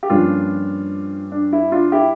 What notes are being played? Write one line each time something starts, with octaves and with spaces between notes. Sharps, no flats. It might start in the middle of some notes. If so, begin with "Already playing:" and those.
G4
G2 F3 A#3 C#4 D4 F4
D4
E4
D4 F4
E4 G4